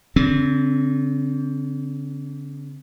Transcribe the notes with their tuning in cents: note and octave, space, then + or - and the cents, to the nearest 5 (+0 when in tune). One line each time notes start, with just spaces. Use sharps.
D3 -40 C4 +0